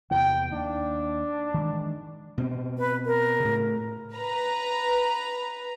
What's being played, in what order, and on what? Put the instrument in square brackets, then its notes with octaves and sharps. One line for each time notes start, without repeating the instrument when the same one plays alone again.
[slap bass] E2 C3 E3 [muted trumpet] G5
[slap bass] D#2 [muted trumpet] D4
[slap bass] D#3 E3 G#3
B2 C4
[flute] B4
A#4
[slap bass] A2 C#3
[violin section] B4 A#5